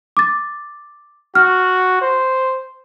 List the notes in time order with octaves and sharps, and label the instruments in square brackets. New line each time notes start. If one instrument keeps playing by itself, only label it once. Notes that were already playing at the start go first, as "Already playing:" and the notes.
[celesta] D6 A6
[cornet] F#4 [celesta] F6
[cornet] C5